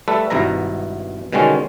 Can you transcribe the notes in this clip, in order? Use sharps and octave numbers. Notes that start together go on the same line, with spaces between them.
G3 A3 A4 B4
G#1 G2 B2 E4 E5 A#5
B2 D3 D#3 G3 G#3 C#4